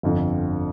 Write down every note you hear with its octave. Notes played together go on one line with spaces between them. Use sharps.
G1 F2 D3 F3